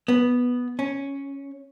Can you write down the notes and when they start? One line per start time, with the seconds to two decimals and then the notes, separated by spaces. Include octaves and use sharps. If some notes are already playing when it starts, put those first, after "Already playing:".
0.08 B3
0.79 C#4